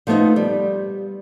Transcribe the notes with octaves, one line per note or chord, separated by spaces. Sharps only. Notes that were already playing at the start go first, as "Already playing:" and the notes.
F3 A3 B3 D4 D#4
G3